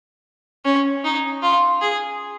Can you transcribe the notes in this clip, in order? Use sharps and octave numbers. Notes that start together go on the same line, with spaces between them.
C#4
D#4
F4
G#4